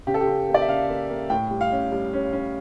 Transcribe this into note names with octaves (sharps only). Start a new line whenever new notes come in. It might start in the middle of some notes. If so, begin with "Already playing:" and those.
C#3 G4
A4
G4
C#3
A#3
D5
E5
C#3 F5
A#3
A#3
A2 G5
G3
F5
C#4
G3
C#4
C#4